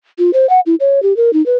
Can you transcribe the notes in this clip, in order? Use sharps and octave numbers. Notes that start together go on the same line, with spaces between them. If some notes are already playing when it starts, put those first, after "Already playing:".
F4
C5
F#5
E4
C#5
G4
A#4
D#4
B4